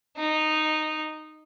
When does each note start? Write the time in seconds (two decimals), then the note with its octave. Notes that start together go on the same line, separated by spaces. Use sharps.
0.17 D#4